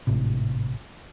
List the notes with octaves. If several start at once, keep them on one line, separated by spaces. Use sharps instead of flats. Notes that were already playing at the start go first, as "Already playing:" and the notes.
G#1 A2 C3